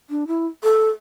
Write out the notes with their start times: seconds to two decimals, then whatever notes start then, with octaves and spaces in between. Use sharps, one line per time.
0.10 D4
0.27 E4
0.64 A4